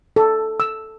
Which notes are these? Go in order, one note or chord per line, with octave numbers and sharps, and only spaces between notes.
A4
E6